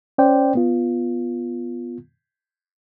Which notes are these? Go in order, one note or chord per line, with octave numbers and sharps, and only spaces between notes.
C#4 C5 D5 G5
B3 F4